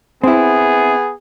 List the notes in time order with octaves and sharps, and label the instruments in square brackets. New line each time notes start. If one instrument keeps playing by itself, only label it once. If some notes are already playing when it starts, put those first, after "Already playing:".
[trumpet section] B3 G#4 [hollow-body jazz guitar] C4 E4